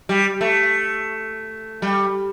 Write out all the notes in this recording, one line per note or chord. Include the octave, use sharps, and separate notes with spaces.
G3
A3
G3